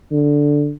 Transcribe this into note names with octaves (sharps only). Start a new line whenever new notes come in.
D3